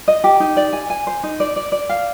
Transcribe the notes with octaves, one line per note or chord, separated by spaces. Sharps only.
D#5
G4
D#4
D5
G#5
G#5
C5
D#4
D5
D5
D5
F5